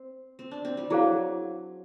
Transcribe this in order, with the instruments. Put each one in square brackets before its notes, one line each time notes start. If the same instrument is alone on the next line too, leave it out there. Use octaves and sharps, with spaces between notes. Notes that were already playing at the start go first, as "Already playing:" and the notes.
Already playing: [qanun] C4
C4
D4
C4
G3
[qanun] F#3 [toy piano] E4 G#4 C5 F5